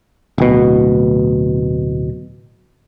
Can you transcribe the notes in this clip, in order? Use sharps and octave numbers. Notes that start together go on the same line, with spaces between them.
D1 B2